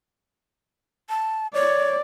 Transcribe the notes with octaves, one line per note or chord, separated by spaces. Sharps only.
A5
C#5 D5